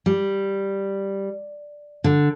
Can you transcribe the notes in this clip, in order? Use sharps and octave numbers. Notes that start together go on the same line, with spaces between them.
G3
D3